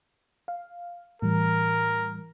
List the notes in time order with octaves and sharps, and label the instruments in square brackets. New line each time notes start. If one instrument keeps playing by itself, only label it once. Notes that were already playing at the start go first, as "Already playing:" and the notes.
[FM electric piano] F5
[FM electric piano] A2 E3 G3 [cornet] A#4